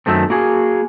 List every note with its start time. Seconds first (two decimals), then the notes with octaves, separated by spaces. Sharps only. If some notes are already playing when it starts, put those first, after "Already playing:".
0.06 F#2 D#3 A3 C4
0.30 A#3 F#4 G#4